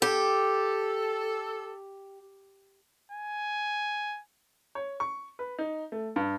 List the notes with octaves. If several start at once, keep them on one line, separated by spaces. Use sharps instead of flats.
G4 A4
G#5
C#5
C#6
B4
D#4
A3
G2